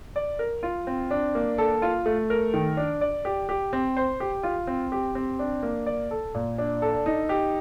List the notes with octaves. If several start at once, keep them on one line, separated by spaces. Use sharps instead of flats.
D5
A#4
F4
C4
D4
A#3
A4
F4
A3
A#4
D#3
D4
D5
G4
G4
C4
C5
G4
F4
C4
G4
C4
D4
A#3
D5
A4
A#2
D4
A4
D#4
G4